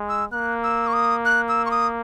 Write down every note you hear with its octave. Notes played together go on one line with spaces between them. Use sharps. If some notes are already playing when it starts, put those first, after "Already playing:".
Already playing: G#3
E6
A#3 F#6
E6
C#6
D#6
F#6
E6
C#6
D#6